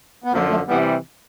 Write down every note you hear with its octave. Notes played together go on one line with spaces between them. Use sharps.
B3
F#2 D3 F3 A#3
A3
C3 E3 G3 B3